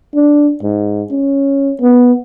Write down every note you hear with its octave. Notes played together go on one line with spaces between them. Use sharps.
D4
G#2
C#4
B3